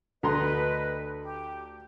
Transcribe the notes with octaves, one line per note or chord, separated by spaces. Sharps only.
D2 B4 D#5 A#5 C6
G4